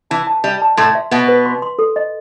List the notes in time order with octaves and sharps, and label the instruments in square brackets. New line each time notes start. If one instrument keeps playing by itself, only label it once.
[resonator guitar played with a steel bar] E3 [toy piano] A5
[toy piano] A5
[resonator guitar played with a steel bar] G3 [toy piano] E5
[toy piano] A5
[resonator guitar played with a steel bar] A2 A3 [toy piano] C6
[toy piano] E5
[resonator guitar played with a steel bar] B2 B3 [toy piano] E5
[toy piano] B4
C6
C6
A4
D#5